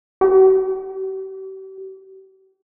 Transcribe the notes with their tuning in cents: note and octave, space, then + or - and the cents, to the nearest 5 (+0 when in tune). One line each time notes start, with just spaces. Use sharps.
G4 -40